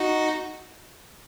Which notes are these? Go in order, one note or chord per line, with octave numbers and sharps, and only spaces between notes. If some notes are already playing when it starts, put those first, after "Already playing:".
Already playing: D#4 F#4